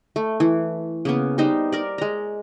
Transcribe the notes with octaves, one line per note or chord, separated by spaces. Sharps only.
A3
E3
C#3 A#3 B3
G3 B3 D#4 C5
A#4 D5
G#3 A#5